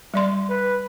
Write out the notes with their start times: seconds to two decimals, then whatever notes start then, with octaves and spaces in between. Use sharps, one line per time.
0.14 G3 D5 C6
0.49 B4